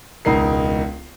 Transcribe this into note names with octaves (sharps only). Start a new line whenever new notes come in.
E1 C#2 D#4 A#4 C7